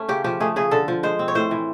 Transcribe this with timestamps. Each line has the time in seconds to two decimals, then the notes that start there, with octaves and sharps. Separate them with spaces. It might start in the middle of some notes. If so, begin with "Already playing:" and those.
Already playing: A3 C#4
0.08 C#3 G4
0.24 F3 G4
0.40 A3 G#4
0.56 C#3 G#4
0.71 D3 A4
0.88 F3
1.03 G#3 C5
1.19 C4
1.28 C#5
1.35 A2 C5
1.51 E3